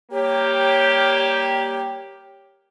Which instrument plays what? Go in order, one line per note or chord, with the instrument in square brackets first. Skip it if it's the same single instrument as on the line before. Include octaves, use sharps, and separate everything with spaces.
[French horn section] G3 A#3 G4 [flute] C#5